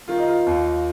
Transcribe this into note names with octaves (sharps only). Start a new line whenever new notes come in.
D#3 F4
D#4
F4
D#2